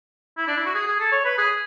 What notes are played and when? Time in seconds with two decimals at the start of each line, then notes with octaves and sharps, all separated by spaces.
0.37 E4
0.48 D4
0.57 E4
0.66 F#4
0.75 G#4
0.88 G#4
1.00 A4
1.12 C#5
1.25 B4
1.38 G#4